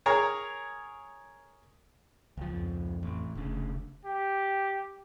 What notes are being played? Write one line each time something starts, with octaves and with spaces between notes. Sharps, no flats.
G#4 A#4 C#5 A#5
C#2 F3
F2
A1
F1 D2 C#3
G4